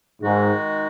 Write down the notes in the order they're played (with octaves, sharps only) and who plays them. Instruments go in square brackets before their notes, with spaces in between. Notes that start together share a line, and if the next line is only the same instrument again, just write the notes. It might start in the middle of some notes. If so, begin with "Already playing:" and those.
[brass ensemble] G#2 [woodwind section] D#3 G#3 D#4 F#4